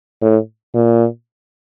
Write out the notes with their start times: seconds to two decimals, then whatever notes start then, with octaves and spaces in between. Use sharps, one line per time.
0.21 A2
0.74 A#2